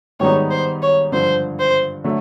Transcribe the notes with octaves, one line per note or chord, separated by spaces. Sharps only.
G#2 D#3 G3 B3 D#4 C#5
C5
C#5
G2 D3 F3 C5
C5
D3 F#3 A3